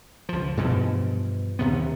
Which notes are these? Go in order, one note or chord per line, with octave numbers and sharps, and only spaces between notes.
C#2 F3
G2 B2 E3 F3
D#2 C3 B3